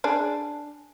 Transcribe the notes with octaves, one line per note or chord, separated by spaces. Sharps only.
D4 G#4